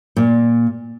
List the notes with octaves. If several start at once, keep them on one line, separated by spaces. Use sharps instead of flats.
A#2